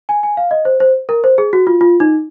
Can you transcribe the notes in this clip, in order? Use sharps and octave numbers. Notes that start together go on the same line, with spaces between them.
G#5
G#5
F5
D#5
C5
C5
A#4
C5
G#4
F#4
F4
F4
D#4